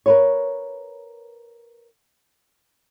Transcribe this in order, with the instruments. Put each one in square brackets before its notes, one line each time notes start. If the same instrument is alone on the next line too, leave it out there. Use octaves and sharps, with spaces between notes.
[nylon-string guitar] A#4 B4 C#5